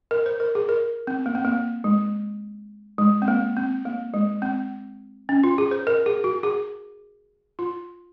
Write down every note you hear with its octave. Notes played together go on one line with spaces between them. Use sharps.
A#4
C5
A#4
G#4
A#4
C4
A#3
C4
A#3
G#3
G#3
C4
A#3
C4
A#3
G#3
C4
C#4
F4
G#4
C5
A#4
G#4
F#4
G#4
F4